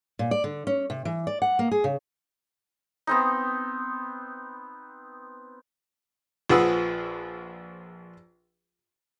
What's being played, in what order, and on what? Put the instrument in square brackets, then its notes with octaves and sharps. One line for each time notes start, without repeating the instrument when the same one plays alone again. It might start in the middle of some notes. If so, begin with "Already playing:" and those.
[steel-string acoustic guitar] A#2
D5
D3
C#4
C3
E3
D5
F#5
A#3
G#4
C#3
[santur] B3 C4 D#4
[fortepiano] A#1 F3 G#4 B4 F#5 E6